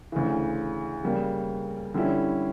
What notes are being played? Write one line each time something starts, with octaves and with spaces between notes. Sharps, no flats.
D2 C#3 E3
C#3 G3 A#3
D3 G3 C#4 E4